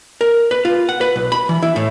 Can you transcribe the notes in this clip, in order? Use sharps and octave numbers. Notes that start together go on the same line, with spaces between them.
A#4
B4
F4
F#5
B4
B1
B5
E3
E4
A2